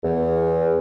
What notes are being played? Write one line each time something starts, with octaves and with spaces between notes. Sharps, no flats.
E2